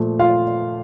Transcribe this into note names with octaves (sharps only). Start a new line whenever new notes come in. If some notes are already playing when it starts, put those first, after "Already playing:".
Already playing: A#2 F3 A3
F4 F5